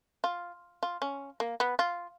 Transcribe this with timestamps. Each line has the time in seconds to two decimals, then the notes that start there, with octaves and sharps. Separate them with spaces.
0.24 F4
0.83 F4
1.02 C#4
1.40 A#3
1.60 B3
1.79 F4